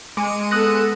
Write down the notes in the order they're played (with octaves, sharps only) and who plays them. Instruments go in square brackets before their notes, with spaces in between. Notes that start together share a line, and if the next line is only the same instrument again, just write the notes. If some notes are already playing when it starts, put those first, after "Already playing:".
[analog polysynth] G#3 C#7 D#7 [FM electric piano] D6
[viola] B3 A4 [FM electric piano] D#6 F#6 A#6